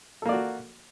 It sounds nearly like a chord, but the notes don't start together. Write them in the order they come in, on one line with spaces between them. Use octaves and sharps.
A4 A#3 D5 F#4